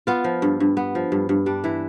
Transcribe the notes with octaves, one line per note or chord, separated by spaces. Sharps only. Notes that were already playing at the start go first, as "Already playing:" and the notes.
B3 F4
F3
G2
G2
B3
F3
G2
G2
G3 D4
E3 E4